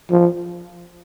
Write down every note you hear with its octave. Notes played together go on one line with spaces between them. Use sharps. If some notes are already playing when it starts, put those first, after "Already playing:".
F3